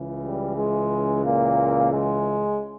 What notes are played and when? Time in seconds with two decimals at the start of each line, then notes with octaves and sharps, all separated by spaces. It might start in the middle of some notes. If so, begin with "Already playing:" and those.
Already playing: C#2 C#3 E3
0.22 G3
0.56 G#3
1.24 A#2 A#3
1.91 G#3